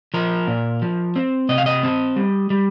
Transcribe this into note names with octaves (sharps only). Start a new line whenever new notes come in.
F3 A#4
A#2
F3
C4
C3 D#5
F5
D#5
C4
G3
G3